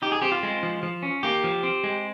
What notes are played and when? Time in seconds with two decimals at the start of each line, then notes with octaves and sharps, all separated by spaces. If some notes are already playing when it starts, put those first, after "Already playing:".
0.02 D#4 G4
0.12 G#4
0.22 C4 G4
0.32 F4
0.43 G#3
0.63 F3
0.83 F3
1.03 C#4
1.23 A#3 G4
1.44 F3
1.63 C4
1.84 G#3